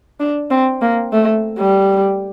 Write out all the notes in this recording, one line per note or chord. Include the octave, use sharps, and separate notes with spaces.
D4
C4
A#3
A3
G3